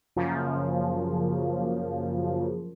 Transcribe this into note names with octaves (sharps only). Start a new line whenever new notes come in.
F#2 C#3 F3 A#3